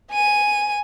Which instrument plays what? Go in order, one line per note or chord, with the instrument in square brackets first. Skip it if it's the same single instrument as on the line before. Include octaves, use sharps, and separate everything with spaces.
[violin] G#5 D#7